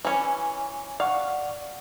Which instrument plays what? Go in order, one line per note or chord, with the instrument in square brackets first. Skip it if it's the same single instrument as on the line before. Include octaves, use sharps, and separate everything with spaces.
[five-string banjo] E3 C#4
[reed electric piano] D5 F#5 C#6 [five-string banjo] F5